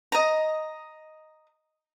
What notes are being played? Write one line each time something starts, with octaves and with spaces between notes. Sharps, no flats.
D#5 A#5